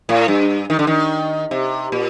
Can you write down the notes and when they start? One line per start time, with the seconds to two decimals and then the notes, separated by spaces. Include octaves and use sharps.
0.09 A2
0.28 G2
0.70 D#3
0.79 D3
0.87 D#3
1.51 C3
1.92 A#2